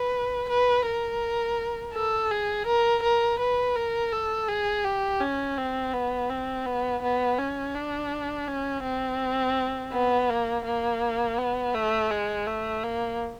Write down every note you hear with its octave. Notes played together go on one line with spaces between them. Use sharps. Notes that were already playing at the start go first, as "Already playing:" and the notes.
Already playing: B4
B4
A#4
A4
G#4
A#4
A#4
B4
A#4
A4
G#4
G4
C#4
C4
B3
C4
B3
B3
C#4
D4
C#4
C4
B3
A#3
A#3
B3
A3
G#3
A3
A#3